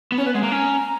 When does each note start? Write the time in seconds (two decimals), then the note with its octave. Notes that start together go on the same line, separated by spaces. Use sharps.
0.12 B3
0.18 C#4 C#5
0.26 B3 B4
0.34 G#3 F#5
0.43 A#3 A#5
0.51 C#4